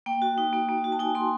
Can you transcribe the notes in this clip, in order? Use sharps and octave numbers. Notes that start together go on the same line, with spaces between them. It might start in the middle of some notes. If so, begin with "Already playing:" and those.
A#3 G5
F#4
D#4
A#3
A#3
F#4
A5
D#4 G#5
A#3 C6